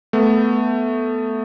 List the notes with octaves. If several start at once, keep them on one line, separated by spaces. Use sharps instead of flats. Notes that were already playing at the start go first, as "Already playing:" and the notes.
A3 B3